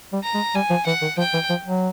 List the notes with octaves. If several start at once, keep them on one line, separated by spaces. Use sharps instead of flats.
G3
A#5
G#3
G3 G#5
F3
E3 F#5
D#3
F3 G5
E3
F3
F#3